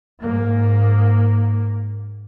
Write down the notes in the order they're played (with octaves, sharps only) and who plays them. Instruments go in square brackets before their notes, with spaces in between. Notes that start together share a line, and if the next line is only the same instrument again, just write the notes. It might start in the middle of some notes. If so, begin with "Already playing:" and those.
[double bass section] G#2 A#3